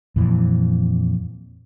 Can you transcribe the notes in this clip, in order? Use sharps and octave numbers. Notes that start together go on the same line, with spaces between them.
F2 A#2 E3